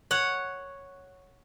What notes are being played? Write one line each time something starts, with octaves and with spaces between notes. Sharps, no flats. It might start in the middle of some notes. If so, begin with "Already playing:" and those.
C#5 F#5